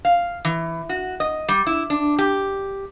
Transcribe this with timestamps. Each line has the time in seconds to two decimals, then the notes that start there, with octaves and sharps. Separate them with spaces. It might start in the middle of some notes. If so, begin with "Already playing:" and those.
0.05 F5
0.45 E3
0.89 F#4
1.20 D#5
1.49 G3
1.67 E4
1.90 D4
2.19 G4